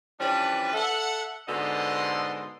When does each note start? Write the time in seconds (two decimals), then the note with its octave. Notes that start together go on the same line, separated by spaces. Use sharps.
0.20 E3 F3 G3 C#4 D4 B4
0.73 A4 E5 F#5
1.49 G#2 B2 D3 A4 D#5 C6